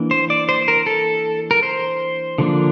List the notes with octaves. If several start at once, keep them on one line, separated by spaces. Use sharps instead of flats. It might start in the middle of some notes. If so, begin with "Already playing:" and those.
Already playing: E3 A#3 D4
C5
D5
C5
A#4
A4
A#4
C5
D3 F3 A#3 D4